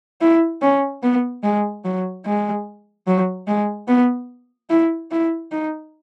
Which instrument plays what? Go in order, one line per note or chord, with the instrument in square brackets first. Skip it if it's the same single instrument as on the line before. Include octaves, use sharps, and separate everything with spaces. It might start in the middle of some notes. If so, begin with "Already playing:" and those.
[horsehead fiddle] E4
C#4
B3
G#3
F#3
G#3
F#3
G#3
B3
E4
E4
D#4